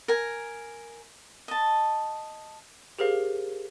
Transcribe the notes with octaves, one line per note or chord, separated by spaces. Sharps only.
A#4 G#5
D#5 A5
G4 G#4 A#4 C5 F5